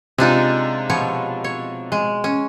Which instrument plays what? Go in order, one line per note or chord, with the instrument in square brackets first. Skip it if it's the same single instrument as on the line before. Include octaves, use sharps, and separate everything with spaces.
[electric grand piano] C3 F4 [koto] G#3 D4 D#4
[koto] B2 F3 C#5
C#5
G#3
C#4